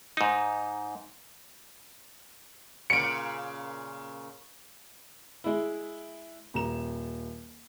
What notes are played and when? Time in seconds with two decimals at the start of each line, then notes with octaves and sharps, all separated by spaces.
0.17 G#2 D#4
2.90 A#2 C#3 C#7 D7
5.44 G#3 E4
6.54 D#1 A#5 E7